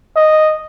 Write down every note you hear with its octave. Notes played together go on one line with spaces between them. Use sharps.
D#5